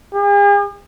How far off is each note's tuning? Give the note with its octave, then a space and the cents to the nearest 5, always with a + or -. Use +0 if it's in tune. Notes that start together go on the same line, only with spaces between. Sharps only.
G#4 -45